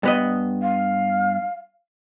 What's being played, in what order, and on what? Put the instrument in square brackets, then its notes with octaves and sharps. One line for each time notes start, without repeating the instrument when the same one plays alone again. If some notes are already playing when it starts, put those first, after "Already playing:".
[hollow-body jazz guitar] G2 B3 D#5
[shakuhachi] F5